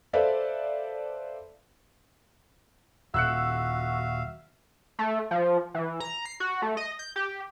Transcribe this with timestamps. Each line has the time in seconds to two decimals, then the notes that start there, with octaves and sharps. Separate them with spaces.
0.13 A4 B4 C5 D5 E5 F5
3.14 D#1 F#4 E5 F5 E6 F#6 C#7
4.99 A3
5.31 F3
5.74 E3
6.00 A#5
6.25 C7
6.40 F#4
6.62 A3
6.77 D#5
6.99 G6
7.16 G4